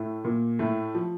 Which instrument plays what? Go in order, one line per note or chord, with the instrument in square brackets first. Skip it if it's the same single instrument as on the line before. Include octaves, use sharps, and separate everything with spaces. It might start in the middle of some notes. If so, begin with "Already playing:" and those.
Already playing: [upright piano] A2 A3
A#2 A#3
A2 A3
F3